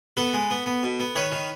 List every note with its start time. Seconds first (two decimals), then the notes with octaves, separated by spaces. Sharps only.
0.17 B3 A4 B4
0.33 G#3
0.50 B3
0.66 B3
0.83 B2
1.00 B3
1.15 D#3 B4 C#5
1.32 D#3